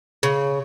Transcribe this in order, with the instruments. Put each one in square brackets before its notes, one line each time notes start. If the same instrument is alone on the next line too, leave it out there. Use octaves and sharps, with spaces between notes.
[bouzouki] C#3